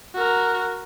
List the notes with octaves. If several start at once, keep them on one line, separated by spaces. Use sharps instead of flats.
F#4 A#4